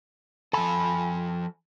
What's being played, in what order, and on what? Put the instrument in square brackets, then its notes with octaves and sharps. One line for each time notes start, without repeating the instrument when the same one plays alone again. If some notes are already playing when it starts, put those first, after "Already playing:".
[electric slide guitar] F3 A4 [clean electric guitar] G#5 B5